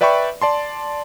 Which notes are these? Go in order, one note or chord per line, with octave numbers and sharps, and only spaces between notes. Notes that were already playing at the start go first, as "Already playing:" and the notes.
B4 D5 E5 G5 B5 C#6
D5 A5 C6